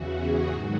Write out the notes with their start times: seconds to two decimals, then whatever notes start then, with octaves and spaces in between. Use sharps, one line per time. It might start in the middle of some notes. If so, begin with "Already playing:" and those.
Already playing: E2 C#3 E3 F#4
0.14 G#4
0.47 G#2 D#3 F#3 F#4